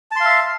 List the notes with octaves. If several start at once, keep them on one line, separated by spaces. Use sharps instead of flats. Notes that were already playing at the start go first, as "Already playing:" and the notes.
E5 F5 A5 C6